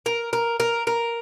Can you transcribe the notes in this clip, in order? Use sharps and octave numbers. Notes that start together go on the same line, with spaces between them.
A#4
A#4
A#4
A#4